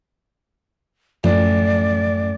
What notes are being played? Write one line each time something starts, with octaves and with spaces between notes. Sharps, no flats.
A1 F#2 F3 D5